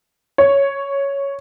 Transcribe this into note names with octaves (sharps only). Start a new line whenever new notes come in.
C#5